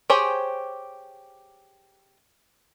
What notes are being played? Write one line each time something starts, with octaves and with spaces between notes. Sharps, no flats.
G4 G#4 C5 C#5 G#5